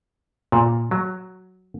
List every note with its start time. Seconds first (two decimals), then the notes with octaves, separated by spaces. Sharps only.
0.52 A#2
0.91 F#3